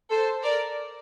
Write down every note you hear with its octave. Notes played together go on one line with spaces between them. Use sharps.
A4 C5
A#4 D5